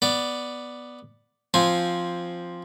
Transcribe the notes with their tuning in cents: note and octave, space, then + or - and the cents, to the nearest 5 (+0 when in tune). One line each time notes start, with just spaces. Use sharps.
B3 +0 D5 +0
F3 +0 C4 +0 G#5 +0